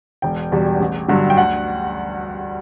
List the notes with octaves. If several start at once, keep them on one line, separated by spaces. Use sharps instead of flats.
E1 G5
E2 B2 G3
A1
G2 D3 F#3
G5
D2 F#5